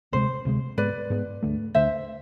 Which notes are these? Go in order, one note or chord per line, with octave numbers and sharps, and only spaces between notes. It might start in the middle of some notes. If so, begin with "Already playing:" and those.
D2 C3 G#3 C5
D2 C3 G#3
G#2 G#3 B3 B4 D5
G#2 G#3 B3
D2 D3 A3
D2 D3 A3 C5 E5